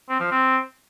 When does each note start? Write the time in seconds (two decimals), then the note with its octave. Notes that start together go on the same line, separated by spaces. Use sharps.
0.09 C4
0.20 F3
0.31 C4